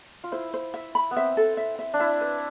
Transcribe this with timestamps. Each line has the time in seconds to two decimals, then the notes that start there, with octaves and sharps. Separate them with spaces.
0.24 F4
0.32 E4 C5
0.54 C5
0.74 E5
0.95 B5
1.11 B3
1.16 C4 E5
1.37 A4
1.57 E5
1.79 E5
1.94 D4
2.00 E4 A5
2.21 B4